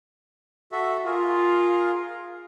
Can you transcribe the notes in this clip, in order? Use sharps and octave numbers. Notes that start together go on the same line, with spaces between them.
F#4 A4 E5
F4 G#4 A#4